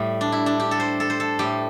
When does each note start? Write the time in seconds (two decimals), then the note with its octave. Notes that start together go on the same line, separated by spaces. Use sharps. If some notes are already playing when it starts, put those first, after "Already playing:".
Already playing: A2 G3
0.21 D4
0.32 E4
0.46 D4
0.60 G4
0.71 A4
0.80 C5
1.00 A4
1.10 C5
1.20 A4
1.39 A2 G3 G4